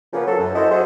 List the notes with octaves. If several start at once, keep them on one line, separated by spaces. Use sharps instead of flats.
C#3 F3 A#3 B3 C#4
F#3 A4
F#2
E4 F#4 A4 C5 D#5
F#3 G#4 A4 C5